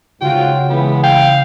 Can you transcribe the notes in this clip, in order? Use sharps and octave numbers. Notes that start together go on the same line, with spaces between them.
G#2 C#3 F4 F#4 G5
E3 G#3 B3
F5 G5